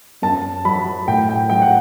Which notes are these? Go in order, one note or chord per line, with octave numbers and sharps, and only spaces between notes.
F#2 A5
F#3 B5
A2 G5
G5
F#3 G5
F#5